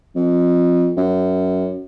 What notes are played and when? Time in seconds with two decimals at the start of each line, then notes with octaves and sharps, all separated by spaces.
0.16 F2
0.97 F#2